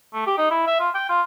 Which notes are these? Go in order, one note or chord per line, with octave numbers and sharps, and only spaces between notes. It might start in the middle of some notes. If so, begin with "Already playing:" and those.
A3
G4
D#4
E4
E5
F4
G5
F4